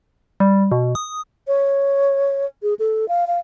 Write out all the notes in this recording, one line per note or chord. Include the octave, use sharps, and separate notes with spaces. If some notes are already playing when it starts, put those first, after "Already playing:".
G3
B2
D#6
C#5
G#4
A4
F5
F5